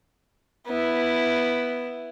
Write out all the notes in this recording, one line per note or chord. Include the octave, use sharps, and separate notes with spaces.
B3 E4